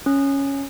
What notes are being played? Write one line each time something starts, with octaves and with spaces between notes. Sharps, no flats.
C#4